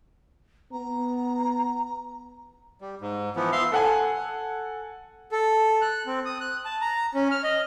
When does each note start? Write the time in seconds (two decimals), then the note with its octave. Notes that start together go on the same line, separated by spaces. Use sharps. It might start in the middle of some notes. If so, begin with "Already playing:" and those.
0.72 B3 A#5
2.81 G3
3.01 G#2
3.36 E3 F3 B3
3.52 E5 F5 C6
3.72 A4 F#5 G#5
5.32 A4
5.81 F#6
6.06 C4
6.25 D#6
6.40 F#6
6.65 A5
6.81 A#5
7.15 C#4
7.31 F6
7.44 D#5